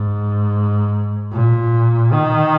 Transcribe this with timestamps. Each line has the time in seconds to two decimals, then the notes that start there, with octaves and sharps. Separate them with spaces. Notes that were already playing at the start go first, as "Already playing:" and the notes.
Already playing: G#2
1.33 A#2
2.13 D#3